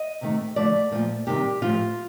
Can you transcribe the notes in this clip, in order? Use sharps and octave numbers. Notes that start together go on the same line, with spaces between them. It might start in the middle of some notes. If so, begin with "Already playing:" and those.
Already playing: D#5
C3 D#3 A3
D3 F3 A3 D5
A#2 F3 A3
C3 D#3 G3 G4
A2 F3 A3 F4